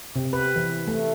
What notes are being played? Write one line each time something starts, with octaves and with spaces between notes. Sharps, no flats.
C3
B4
E3
A3